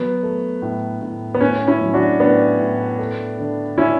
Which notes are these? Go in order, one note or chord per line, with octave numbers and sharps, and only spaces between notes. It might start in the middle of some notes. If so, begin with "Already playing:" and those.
Already playing: F#3 B3
A3
A2
A2
B3
A2 C#4
C#4 E4
F#3
D4 F#4
A2 B3 D4
A2
A3
D3
D3 C#4 E4